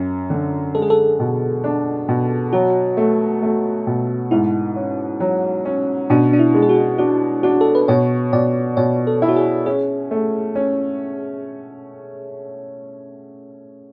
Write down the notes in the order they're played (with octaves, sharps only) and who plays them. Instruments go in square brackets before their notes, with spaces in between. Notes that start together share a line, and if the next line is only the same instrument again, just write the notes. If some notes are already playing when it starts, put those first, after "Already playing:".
Already playing: [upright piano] F#2
D3
[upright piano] G#3 [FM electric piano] A4
[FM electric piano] G#4
A4
[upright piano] B2
D4
B2
[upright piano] F#3 [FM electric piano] F#4
[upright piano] A3
A3
B2
[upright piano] G#2 [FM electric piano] E4
[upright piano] C#4
F#3
C#4
[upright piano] B2 [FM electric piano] D4
[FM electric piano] D4
E4
[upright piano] G#3
[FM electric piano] G#4
F#4
[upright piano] D4 [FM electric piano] F#4
[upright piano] D4 [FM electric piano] F#4
[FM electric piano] A4
B4
[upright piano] B2 [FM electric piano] C#5
[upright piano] B2 [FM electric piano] D5
[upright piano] B2 [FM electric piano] C#5
[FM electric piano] A4
[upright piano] E4
[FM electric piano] F#4
G#4
[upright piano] C#4 [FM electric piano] G#4
[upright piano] A3
C#4